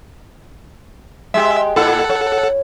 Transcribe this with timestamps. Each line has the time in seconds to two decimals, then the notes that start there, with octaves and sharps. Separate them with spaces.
1.34 G#3 G4 E5
1.76 A#2 E4 A4 F#5
2.09 C#5